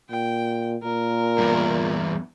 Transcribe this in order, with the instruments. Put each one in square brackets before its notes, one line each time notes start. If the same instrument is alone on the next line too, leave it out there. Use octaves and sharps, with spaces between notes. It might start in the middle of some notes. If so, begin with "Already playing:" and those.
[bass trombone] A#2 [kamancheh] G5
[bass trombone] A#2 [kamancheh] A#4
[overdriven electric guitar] E2 G2